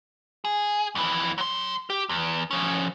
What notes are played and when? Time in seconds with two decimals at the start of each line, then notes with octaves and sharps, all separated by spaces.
0.45 G#4
0.95 F2 E3
1.38 F#3 C6
1.90 G4
2.09 E2
2.51 F3 C#4